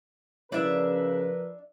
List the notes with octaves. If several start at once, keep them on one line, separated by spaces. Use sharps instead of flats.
C#3 F3 D4 E4 A#4 B4 D5 E5